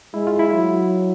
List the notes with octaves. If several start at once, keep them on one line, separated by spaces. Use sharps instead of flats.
G#3 E4
F4
E4
F#3